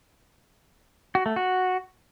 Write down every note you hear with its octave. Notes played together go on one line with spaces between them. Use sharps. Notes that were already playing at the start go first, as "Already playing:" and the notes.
F#4
A3
F#4